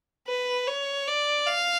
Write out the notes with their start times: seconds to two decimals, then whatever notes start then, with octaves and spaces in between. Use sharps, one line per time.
0.27 B4
0.67 C#5
1.08 D5
1.47 F5